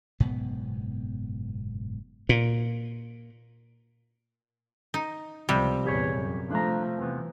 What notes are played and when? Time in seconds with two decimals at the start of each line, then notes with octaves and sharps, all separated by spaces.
0.20 F#1 G#2 B2 B3
2.29 A#2
4.94 D#4
5.49 C#2 C3 F3 G3
5.85 A#1 E2 G4 G#4 C#5
6.17 F#2
6.51 F3 A3 D4 A#5
6.98 E2 C3 E3 B3